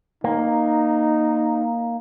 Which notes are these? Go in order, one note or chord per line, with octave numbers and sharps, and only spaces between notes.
A#3 D#4